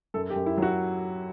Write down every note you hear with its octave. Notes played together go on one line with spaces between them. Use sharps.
F#2 A4
G4
F#2
E4
F#3
F#4